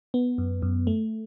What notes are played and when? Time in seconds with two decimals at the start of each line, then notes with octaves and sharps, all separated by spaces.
0.14 B3
0.38 F#2
0.62 F#2
0.87 A3